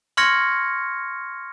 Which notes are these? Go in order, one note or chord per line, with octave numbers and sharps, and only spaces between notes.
C6 C#6 F6 G#6 A#6 C#7